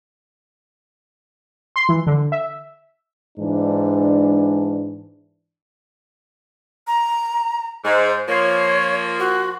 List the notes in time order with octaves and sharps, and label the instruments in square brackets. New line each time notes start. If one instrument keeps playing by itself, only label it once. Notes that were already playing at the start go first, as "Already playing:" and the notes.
[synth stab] C6
E3
D3
E5
[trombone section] G#2 E3 D4
[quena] A#5
[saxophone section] G#2 [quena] C5
[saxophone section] F3 A#3 [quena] C#5
[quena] F#4